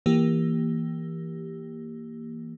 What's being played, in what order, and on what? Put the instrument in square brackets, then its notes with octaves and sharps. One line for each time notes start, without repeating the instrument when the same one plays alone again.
[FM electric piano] E3 A#3 G4